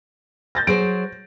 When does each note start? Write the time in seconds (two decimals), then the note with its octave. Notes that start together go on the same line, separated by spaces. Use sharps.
0.55 G6 A6 A#6
0.67 F#3 G#4 C5 D7